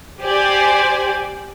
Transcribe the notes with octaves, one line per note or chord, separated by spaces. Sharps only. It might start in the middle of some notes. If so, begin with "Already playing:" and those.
G4 C5 D5 G#5